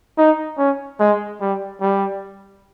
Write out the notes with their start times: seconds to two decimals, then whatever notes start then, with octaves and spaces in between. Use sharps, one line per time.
0.18 D#4
0.58 C#4
1.00 G#3
1.41 G3
1.81 G3